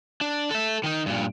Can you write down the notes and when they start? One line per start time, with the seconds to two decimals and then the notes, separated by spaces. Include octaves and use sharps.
0.21 D4
0.51 A4 E5
0.84 D#3 D#4
1.06 G2 A#2